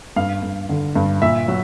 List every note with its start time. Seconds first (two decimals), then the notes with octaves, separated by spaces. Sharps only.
0.16 G2 F5
0.43 G2
0.69 D3
0.96 G2
1.22 A#2 E5
1.48 F#3